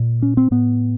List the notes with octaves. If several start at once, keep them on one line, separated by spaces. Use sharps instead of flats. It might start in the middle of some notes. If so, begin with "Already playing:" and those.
Already playing: A#2
C#4
C4
A2 B3